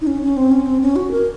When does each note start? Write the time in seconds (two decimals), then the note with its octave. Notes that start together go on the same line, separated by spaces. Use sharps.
0.01 D#4
0.07 C#4
0.22 C#4
0.37 C4
0.51 C#4
0.66 C4
0.81 C#4
0.96 F#4
1.11 A#4